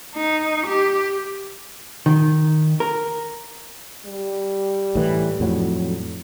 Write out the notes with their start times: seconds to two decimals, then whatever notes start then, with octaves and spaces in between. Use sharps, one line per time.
0.15 D#4
0.67 G4
2.06 D#3
2.80 A#4
4.06 G3
4.95 A2 E3
5.40 F2 A2 F#3